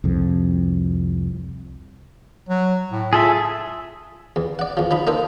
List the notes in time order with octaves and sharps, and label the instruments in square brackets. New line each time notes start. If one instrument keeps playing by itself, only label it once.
[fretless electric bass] C2 F2
[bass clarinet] F#3
A2
[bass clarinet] F4 [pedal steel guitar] G#4 A4 E5
[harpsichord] E2
D5 F#5
E2 F3
F3 D#4 B5
A#3 D#4 A4 C5